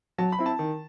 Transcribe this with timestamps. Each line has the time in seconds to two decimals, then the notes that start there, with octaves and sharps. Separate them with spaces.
0.18 F#3 A5
0.32 B5
0.39 C4 E4
0.46 A5
0.59 D#3